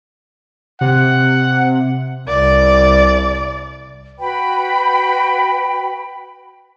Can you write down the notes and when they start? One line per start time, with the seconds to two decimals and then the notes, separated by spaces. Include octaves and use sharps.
0.81 C3 F#5
2.28 C2 D5
4.19 F#4 B4 G5 B5